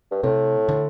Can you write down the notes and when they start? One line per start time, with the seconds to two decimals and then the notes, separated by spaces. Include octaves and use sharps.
0.11 G2
0.23 A2 C3
0.69 D3